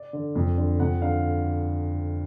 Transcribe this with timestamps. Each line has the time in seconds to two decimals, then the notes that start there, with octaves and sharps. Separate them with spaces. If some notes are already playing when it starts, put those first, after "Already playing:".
Already playing: D5
0.13 D3
0.35 F2
0.58 D3
0.80 F2 F#5
1.02 D3 F5